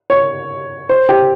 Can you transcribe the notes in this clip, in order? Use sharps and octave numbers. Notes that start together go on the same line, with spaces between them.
C#5
C5
G4